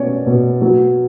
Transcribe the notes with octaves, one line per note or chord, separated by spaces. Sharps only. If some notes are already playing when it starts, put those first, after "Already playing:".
Already playing: B2 C#4 C#5 D5
B2
F#3